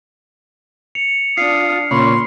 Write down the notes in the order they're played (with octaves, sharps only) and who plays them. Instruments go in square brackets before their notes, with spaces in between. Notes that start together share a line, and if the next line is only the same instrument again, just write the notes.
[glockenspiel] C#7 F7
[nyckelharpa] D4 D#6 [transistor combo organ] F4 [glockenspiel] C7
[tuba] A#2 [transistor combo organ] C#3 C#4 [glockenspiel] B5 [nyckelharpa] C6